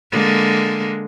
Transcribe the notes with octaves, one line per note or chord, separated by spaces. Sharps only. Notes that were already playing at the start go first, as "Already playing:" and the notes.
D3 G#3 A#3